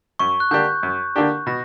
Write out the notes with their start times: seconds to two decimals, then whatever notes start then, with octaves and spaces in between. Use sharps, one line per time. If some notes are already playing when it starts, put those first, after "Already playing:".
0.19 F#2 C#6
0.40 F#6
0.51 D3 A#3 D4 G4 G6
0.83 F#2
1.16 D3 A#3 D4 G4
1.46 B2 A#6